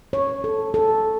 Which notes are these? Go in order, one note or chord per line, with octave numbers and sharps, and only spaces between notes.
C#5
A4
A4